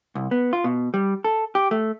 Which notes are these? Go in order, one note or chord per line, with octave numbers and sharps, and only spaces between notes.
C2
B3
F4
B2
G3
A4
G4
A3